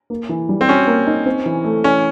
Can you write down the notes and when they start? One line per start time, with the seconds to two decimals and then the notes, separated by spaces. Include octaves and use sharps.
0.10 A#3
0.29 E3
0.49 G3
0.61 C4
0.68 C#4 F#4
0.87 A#3
1.06 D#4
1.26 C4
1.46 E3
1.65 A3
1.84 E3 C#4